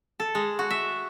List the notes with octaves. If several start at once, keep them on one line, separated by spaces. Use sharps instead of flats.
A4
G#3
F#4
E5